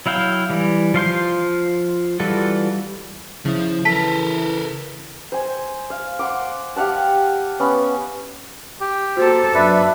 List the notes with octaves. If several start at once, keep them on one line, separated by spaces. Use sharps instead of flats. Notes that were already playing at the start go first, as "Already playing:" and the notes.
F#3 E4 F5 G5
E3 G3
F3 F5 C6 G6
E3 G3 F4 F#4 A4
C#3 F3 E4
E3 A4 A#4 A5 B6
C5 G#5
F5
F#5 C6 D6
G4 F5 F#5 A5
B3 C#4
G4
A#3 F#4 A4 C5
F#2 D4 B4 E5